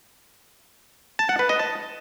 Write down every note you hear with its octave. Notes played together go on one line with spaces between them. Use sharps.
A5
F#5
B4
D#5
A5